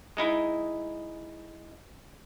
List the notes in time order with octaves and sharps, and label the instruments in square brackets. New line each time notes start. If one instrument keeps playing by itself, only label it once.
[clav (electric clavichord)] G#3 D#4 E4